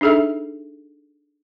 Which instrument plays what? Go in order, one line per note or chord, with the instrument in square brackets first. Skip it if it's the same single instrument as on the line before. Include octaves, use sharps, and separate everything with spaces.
[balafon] D4 D#4 G#4 A4 E5